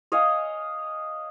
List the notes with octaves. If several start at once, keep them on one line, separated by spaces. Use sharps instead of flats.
C#5 D#5 F5 G#5